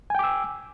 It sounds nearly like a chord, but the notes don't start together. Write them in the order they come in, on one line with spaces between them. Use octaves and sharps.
G#5 G5 D6 E6